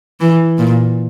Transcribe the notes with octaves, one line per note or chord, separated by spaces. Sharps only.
E3
A#2